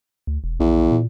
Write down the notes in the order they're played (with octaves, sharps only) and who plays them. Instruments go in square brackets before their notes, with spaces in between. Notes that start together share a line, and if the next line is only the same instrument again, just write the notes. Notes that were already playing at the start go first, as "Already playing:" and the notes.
[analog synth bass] D2
E1
[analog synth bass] A#1 [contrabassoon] E2
[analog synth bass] A#2